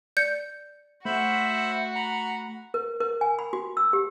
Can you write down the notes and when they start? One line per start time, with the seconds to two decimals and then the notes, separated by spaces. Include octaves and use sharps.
0.17 D5 G6 C#7
1.05 A3 F#4 C5 E5 B5
1.95 A#5 B5
2.74 A#4
3.00 A#4
3.21 G#5
3.39 B5
3.53 F#4
3.77 E6
3.93 G4